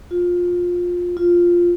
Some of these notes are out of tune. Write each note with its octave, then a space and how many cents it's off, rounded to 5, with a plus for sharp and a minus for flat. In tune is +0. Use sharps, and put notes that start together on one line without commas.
F4 +20
F4 +0